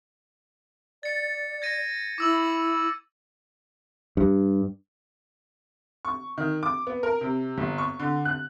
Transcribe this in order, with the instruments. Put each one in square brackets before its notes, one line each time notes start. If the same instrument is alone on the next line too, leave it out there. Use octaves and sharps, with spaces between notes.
[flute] D5 [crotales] A6 C#7
[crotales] G#6 A#6 D#7
[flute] E4 [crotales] D6 E6 F#7
[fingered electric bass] G2
[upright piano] C#6
D#3
D6
B3
A#4
C3
G1
C#6
D3
F#6